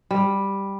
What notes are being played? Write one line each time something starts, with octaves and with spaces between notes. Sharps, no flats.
G3